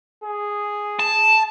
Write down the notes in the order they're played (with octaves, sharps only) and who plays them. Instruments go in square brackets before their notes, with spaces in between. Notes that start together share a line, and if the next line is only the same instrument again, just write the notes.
[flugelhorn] G#4
[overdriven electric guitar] A5